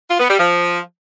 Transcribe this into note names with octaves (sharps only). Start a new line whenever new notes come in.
F4
B3
G3
F3